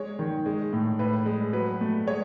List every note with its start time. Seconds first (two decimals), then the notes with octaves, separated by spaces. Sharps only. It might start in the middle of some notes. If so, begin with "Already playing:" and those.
Already playing: G#3 C#5
0.19 D#3
0.46 G#3
0.73 A2
0.99 A2 B4
1.26 G#3
1.53 F#3 B4
1.81 A3
2.07 G#3 C#5